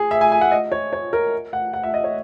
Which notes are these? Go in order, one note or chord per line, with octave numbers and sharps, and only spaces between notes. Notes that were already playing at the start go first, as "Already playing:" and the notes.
Already playing: G#4
E5
G#5
G#5
F#5
D#5
C#5
C#5
A#4
F#5
F#5
E5
D#5
C#5